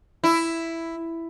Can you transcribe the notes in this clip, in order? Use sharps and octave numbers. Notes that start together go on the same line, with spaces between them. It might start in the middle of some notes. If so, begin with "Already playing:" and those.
E4